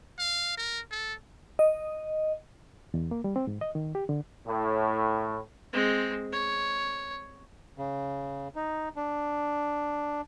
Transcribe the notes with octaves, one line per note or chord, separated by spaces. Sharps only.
F5
A#4
A4
D#5
E2
A#3
G3
C4
G#2
D#5
D#3
G4
D3
A2
G#3 C4
C#5
C#3
D#4
D4